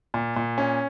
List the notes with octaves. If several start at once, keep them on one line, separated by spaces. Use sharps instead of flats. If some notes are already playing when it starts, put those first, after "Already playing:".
A#2
A#2
C#4